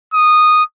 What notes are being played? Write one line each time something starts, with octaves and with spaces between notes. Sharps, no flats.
D#6